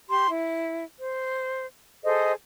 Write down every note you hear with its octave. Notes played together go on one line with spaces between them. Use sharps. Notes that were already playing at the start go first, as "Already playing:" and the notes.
G4 C6
E4
C5
G#4 A4 C5 D#5